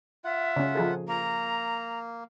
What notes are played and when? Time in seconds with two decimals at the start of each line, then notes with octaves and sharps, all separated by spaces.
0.24 F4 E5 F#5
0.56 C#3 C#4
0.75 F3 G#4 A4
1.08 A#3 A#5